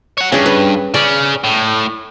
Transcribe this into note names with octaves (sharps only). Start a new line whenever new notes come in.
C#5 F#5
G2 C#4 G#4
B4
C#3 C#4 D5
A2